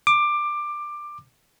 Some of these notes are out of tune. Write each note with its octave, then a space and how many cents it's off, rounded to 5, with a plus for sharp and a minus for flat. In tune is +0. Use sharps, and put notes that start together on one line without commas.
D6 +15